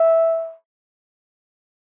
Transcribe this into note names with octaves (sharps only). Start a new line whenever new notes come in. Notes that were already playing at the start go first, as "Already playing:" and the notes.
Already playing: E5